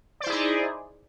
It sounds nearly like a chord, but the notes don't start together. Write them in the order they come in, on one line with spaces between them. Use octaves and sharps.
D5 C5 E4 G#4 D#4